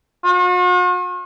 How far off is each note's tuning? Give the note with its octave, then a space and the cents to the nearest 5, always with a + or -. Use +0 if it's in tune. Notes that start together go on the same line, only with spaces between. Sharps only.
F#4 -45